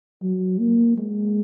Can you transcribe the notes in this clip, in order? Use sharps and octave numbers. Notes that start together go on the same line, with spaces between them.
F#3
A#3
G#3